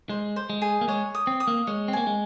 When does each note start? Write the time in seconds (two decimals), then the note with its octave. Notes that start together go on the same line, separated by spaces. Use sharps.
0.09 G#3 C5
0.36 C5
0.50 G#3
0.62 G#4
0.81 A#3
0.88 G#3 C#5
1.15 D#6
1.27 C4
1.40 D#6
1.47 A#3
1.67 G#3 C#5
1.88 C4
1.93 A#3 G#5
2.07 G#3